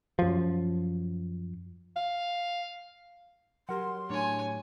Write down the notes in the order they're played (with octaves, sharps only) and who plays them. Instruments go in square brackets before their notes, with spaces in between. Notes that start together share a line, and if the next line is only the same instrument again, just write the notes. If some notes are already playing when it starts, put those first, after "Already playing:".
[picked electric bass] F#2 F3
[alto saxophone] F5
[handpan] F#3 G4 [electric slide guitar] A#4 F#5 [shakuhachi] C6
[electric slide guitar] A2 D4 [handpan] F#3 [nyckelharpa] C#5 G#5